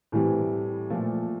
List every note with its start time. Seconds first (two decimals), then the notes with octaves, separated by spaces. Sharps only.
0.12 A2 E3 G3 C4
0.90 A#2 F3 A3